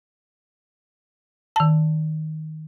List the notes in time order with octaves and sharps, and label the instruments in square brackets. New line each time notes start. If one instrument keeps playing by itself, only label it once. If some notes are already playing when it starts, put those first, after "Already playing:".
[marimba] D#3 A5